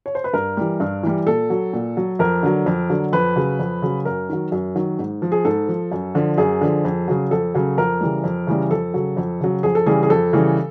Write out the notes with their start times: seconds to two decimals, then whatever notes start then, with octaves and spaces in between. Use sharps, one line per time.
0.06 C#5
0.15 C5
0.24 B4
0.33 G2 A#4
0.57 E3 G3
0.80 G2
1.03 E3 G3
1.26 A#2 A4
1.50 F#3
1.73 A#2
1.97 F#3
2.19 F2 A#4
2.43 D3 F#3
2.66 F2
2.90 D3 F#3
3.13 F2 B4
3.36 C#3 F#3
3.59 F2
3.82 C#3 F#3
4.05 F#2 A#4
4.29 D#3 F#3
4.52 F#2
4.76 D#3 F#3
4.99 G#2
5.22 F3
5.32 G#4
5.45 G#2 A4
5.68 F3
5.92 F#2
6.15 D3 F3
6.38 F#2 G#4
6.61 D3 F3
6.85 F2
7.08 C#3 F#3
7.31 F2 A4
7.54 C#3 F#3
7.78 F2 A#4
8.01 C#3 E3 G3
8.24 F2
8.47 C#3 E3 G3
8.70 F2 A4
8.94 C#3 F#3
9.17 F2
9.41 C#3 F#3
9.63 F2 G#4
9.75 A4
9.86 C#3 E3 G3 G#4
10.03 G#4
10.10 F2 A4
10.33 C#3 E3 G3